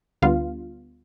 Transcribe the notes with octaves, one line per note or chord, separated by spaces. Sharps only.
D2 D3 G3 B3 D4 F4 F5